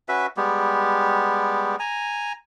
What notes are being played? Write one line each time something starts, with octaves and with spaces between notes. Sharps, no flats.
C#4 F#4 B4 E5
G3 G#3 B3 G4
G#5 A#5